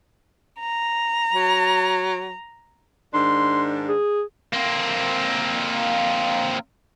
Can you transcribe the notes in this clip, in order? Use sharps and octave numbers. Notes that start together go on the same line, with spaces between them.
A#5
F#3
G#2 D#3 D4 C6
G#4
A#3 C4